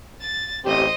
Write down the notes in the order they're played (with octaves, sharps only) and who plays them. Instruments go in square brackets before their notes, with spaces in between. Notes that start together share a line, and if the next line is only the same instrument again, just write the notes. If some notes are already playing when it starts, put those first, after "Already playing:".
[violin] A6
[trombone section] A1 C4 G4 [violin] C5 D#5